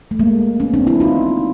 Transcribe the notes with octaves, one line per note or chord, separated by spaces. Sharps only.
A3
G#3 A#3
B3 C#4
C4 D4
D4 E4
D#4 F4